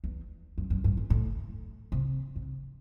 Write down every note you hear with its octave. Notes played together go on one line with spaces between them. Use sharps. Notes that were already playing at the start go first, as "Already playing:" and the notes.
E2
F#2
F#2
G2
A2
A2
C3
C3